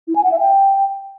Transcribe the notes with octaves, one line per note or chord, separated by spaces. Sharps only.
E4
G#5
F#5
E5
G5